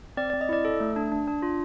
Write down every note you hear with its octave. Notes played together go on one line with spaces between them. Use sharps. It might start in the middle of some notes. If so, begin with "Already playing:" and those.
C4 D5
D5
C4
D#5
E4 D5
A4
A3
D4
D4
D4
F4